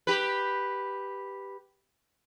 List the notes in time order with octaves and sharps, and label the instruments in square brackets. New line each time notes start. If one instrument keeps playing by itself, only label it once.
[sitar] G4 B4